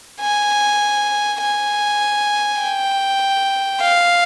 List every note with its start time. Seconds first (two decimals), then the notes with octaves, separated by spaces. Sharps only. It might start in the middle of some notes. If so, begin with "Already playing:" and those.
0.21 G#5
1.41 G#5
2.61 G5
3.81 F5